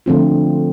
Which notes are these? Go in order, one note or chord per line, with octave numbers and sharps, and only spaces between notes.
D3 F3 A3 C4 F4